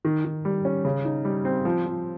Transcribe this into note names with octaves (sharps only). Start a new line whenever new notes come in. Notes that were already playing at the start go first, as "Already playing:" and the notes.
D#3
D#3
G3
C#4
C#3
D#4
G3
C4
F3
F3